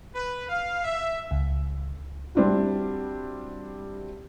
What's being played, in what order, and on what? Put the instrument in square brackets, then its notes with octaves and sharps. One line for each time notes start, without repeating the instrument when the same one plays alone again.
[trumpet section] B4
F5
E5
[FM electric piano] C#2
[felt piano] G3 C4 D4 E4 F#4